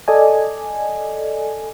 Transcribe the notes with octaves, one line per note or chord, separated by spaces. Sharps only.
A4 D5 D#5 G#5